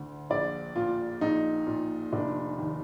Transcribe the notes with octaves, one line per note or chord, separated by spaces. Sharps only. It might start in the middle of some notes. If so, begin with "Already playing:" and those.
Already playing: D2 D3
A#1 D5
A#2 F4
A#1 D#4
A#2
F1 D4
D#2